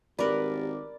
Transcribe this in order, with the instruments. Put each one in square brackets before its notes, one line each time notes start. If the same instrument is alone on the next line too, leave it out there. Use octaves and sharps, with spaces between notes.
[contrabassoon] G#1 [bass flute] G4 [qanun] A#4 B4 [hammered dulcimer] D5